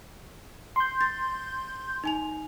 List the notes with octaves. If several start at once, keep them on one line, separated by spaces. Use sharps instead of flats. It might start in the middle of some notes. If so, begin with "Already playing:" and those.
C6 G6
A6
D#4 G#5 F7